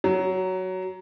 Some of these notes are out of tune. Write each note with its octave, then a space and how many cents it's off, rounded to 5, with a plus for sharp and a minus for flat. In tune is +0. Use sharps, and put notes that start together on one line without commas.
F#3 +10